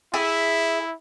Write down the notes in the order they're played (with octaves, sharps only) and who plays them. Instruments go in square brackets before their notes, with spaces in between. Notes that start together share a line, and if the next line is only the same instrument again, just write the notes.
[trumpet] E4 [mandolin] G#4 E5